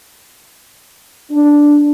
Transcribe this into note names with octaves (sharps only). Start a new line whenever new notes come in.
D4